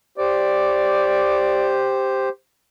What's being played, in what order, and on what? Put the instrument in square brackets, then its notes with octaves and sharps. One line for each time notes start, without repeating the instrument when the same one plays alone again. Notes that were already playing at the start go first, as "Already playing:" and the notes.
[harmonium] G4 C5 [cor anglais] D5